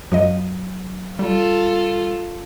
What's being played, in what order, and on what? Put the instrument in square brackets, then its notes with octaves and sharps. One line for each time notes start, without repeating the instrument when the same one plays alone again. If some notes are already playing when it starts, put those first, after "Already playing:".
[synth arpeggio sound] F#2 F3 D#5 [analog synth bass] F#3
[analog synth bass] G3 [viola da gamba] F4 A4